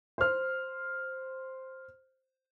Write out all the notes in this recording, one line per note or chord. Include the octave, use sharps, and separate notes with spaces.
C5 F6